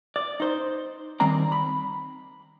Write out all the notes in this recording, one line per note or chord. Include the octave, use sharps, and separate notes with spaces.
D5
D#4 C5
D#3 G3 C4 D5 A#5
B5